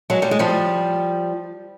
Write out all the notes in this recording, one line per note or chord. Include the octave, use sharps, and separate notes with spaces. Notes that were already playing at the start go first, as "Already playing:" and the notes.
F#3 G#3
G3
G#3
F3 G3